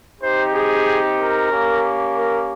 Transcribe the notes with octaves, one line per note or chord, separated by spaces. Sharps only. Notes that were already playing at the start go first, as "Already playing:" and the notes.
C4 D#4 G4 C5
G#4
A#4
A#3 C#4 G4
A#4